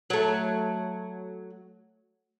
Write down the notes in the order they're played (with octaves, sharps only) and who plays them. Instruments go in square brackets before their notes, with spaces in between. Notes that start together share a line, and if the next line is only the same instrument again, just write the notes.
[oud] F#3 A3